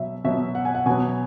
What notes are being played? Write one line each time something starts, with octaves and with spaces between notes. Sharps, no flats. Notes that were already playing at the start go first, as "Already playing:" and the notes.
Already playing: B2 F#3 E5
B2 F#3 E5
F#5
G#5
F#5
B2 F#3 G#5